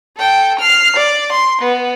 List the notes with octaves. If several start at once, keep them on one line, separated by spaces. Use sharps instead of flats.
A4 G5
F6 C7
D5
C6
B3